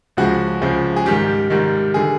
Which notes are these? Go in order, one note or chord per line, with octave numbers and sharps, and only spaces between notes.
C#2 C#3 F3 G#3 F#4
C#2 C#3 F3 G#3
G#4
G#2 D#3 G3 G4
G#2 D#3 G3
D3 G3 G#4